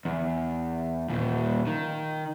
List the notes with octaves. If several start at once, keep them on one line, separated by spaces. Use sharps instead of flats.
E2
D#2 A#2
D#3